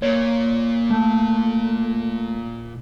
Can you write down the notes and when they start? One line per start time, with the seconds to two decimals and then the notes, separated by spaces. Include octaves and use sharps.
0.02 A#2 C#5
0.91 A3